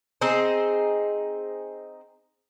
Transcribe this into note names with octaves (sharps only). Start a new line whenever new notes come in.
C4 D#4 G#4 C5